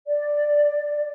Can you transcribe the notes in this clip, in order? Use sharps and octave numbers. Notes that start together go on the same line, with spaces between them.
D5